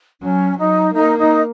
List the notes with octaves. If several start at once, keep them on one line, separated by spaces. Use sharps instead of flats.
F#3 C#4
F#3 D#4
A#3 D#4
D#4